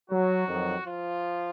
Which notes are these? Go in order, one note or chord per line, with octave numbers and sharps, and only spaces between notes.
F#3 F#4
F2 D#3 F#3
F3 F4